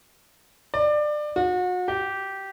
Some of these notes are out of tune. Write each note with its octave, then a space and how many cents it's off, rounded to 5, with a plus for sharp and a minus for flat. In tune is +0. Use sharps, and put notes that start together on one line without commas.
D5 +25
F#4 -35
G4 -15